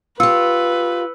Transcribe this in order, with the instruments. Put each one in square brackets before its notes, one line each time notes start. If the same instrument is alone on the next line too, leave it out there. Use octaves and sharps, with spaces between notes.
[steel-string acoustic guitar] F4 G4 [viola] B4 [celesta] E6 C#7